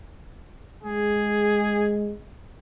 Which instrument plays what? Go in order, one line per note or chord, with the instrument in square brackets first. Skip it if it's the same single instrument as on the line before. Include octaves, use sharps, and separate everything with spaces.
[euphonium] G#3 [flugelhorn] G#4